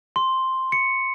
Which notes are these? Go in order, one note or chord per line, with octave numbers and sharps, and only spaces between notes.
C6
C#7